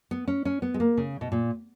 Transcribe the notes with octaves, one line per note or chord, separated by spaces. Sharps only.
B3
C#4
C#4
B3
G#3
A#3
C#3
B2
A#2